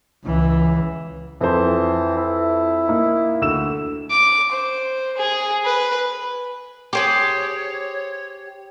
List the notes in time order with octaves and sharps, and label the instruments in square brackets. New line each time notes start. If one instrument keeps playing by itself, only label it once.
[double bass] C#2 E3
[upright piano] F2 C5 [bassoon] E3
[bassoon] E4
[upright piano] A#3 D#4
D2 E6 E7
[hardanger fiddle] D6
C5
G#4
B4
[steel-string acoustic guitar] G4 [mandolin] G#4 C5 D6 [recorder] C#5